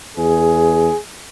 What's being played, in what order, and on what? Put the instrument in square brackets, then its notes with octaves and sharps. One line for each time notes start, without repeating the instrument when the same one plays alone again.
[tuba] E2 [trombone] G#4